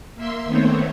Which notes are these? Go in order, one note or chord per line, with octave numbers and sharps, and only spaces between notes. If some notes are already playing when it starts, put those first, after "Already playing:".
A#3 E5 C6 E6
D#3 A3 B3 C4 C5 C#5